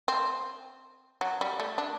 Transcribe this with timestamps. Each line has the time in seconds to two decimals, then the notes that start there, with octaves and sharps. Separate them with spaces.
0.08 C4
1.21 F#3
1.41 G3
1.60 A3
1.78 D4